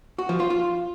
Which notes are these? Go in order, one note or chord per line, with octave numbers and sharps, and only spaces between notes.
F#4
F3
F4
F4